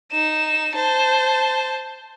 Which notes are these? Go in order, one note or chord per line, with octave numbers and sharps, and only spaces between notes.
D#4 E7
C5 A5